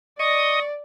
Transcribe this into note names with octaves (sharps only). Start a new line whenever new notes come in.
D5 D#5 C#6 D#6